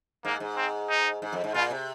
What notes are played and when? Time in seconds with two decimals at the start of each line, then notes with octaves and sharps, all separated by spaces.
0.25 G#2 A#3
0.40 G#2
0.57 C4
0.90 D#4
1.22 G#2
1.33 F2
1.44 G#2
1.54 A#2 F4
1.70 C3